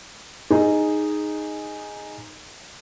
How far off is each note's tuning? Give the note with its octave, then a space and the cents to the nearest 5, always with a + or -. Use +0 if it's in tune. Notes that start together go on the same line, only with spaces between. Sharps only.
D#4 -5 G#4 +0